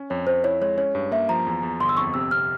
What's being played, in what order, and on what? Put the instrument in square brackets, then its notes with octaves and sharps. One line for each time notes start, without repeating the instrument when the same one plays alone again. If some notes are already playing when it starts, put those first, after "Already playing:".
Already playing: [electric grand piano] C#4
[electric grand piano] F2 [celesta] C#5
[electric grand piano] F2 [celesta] C5
[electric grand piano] E4 [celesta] C#5
[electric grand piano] G#3 [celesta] C#5
[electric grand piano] C#4 [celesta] C#5
[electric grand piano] G2
[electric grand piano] A#3 [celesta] E5
[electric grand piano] F3 [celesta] A#5
[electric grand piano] E2
E2
[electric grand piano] G1 [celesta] C6
[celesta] E6
[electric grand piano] F2 [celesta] C#6
[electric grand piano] C3 [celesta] E6
[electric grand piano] C3 [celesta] F6